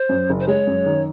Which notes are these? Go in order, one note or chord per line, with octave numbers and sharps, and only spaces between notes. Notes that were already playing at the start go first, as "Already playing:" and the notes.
Already playing: C5
F#2
F#1
C5
G#3 C#5
F#2
D#3